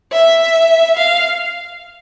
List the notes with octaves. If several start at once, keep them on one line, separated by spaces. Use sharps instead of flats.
E5
F5